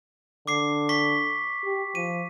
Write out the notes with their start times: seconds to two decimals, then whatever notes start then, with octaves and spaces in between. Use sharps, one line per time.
0.47 D3 D6 C7
0.89 C#6 B6
1.64 G4
1.95 F3 D#7